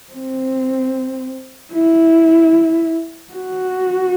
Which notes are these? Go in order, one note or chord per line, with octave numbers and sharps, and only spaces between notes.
C4
E4
F#4